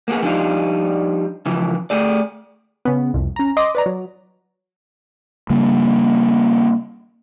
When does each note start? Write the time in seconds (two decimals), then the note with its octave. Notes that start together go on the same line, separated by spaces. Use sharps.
0.08 A#3 B3 F#4 G#4
0.22 F3 G3 D4 D#4 F4
1.46 C#3 E3 F3
1.90 A3 G#4 D5
2.85 C#3 B3
3.14 C2 F2
3.36 C#4 A#5
3.57 D#5 C6 D6 D#6
3.75 B4 D5 A#5
3.86 F#3
5.50 C#3 G3 A#3